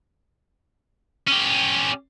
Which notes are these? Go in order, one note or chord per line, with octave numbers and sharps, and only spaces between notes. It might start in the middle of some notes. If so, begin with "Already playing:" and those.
C#4 G4